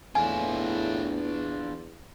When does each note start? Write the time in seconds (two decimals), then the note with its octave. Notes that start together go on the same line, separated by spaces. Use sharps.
0.15 E2 A2 D4 F4 G#5